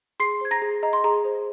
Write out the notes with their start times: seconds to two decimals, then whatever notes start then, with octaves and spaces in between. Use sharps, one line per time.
0.20 G#4 C6 C7
0.41 C5 G#6
0.51 A#5 A#6
0.62 G#4
0.83 D#5 A#5
0.93 C6
1.04 G#4 A#5
1.25 C5